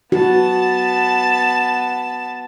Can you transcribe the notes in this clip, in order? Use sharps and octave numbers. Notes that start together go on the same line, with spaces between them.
B3 F#4 A5